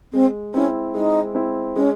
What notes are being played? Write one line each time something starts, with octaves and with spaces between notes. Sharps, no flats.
G#3 C4
C4 C#4 E4
G#3 D#4
C4 E4
G#3 C#4